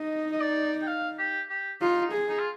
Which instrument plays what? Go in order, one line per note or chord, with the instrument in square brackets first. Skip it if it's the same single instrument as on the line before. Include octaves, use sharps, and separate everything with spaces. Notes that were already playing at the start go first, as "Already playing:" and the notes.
Already playing: [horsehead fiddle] D#4 [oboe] D#5
[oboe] D#5
D5
G5
F5
G4
G4
[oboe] D#4 [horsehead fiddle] F4
[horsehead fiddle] G#4
[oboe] D#4
F4